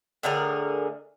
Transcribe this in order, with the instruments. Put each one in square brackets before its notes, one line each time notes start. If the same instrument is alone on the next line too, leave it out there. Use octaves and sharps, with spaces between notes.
[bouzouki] A2 D3 G#4 A#4